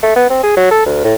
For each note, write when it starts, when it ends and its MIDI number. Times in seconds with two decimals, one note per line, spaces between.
0.03 0.16 57
0.16 0.26 59
0.30 0.41 60
0.43 0.56 68
0.57 0.70 54
0.71 0.82 69
0.86 1.00 38
1.04 1.14 45